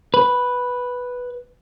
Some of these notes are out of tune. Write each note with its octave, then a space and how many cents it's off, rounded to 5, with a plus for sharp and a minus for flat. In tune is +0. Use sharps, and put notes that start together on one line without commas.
B4 +0